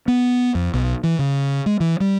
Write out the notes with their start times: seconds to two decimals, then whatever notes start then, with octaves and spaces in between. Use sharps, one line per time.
0.08 B3
0.55 F2
0.74 B1
1.04 E3
1.19 C#3
1.66 G#3
1.80 E3
2.00 G3